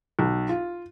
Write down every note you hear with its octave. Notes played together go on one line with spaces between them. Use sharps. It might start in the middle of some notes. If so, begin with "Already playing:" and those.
B1
F4